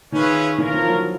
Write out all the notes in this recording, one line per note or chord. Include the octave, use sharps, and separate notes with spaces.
D#3 C#4 F4 G#4 B4 E5
E3 C#4 F4 A#4
F3
F#3